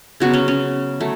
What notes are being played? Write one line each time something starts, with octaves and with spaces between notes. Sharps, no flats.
C#3 F#3 B3 F#4
C#4
C#4
F#3 A3